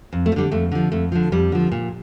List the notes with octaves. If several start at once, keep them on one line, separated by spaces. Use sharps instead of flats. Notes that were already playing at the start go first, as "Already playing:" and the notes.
F2
A3
F3
D3 G3
F2 A3
D3 F3
F2 A3
D3 F3
F2 G3
D3 F3
A#2